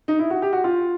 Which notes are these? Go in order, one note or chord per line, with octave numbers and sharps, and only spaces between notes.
D#4
E4
F#4
G4
F#4
F4